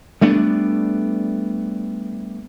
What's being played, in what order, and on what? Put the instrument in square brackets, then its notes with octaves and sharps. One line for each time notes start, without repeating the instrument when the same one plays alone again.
[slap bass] G3 A3 B3 D4